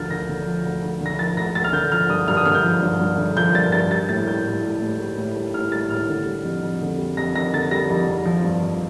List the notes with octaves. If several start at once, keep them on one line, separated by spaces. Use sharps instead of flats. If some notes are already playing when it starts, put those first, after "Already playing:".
Already playing: D2 D3 F3 F6 G6 A6
D2 A#6
D3
F3
D2
D2
D3
A#6
F3 A6
D2 A#6
D2 A6
F6
D3 G6
F3 F6
G2 D#6
G2 F6
D#6
D3 F6
G6
F3
G2
G2
D3
F3 G6
G2 A6
G2 A6
G3 A6
A2 A6
G3 G6
A2
G3
A2
G3
A2
G3
A2 F6
G3 A6
A2 F6
D3
G3
F2
F2
D3
G3
F2 A#6
F2 A#6
D3 A6
G3 A#6
F2
F2
F3
G2
F3